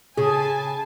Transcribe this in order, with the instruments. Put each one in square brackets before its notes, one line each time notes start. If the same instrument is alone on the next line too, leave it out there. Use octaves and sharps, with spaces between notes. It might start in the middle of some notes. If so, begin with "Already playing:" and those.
[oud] C#3 [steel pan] G#4 [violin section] G#5 A5